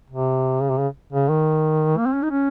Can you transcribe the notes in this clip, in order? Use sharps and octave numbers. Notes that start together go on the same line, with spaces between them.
C3
C#3
C3
C#3
C#3
D#3
A#3
C4
C#4
D#4
C#4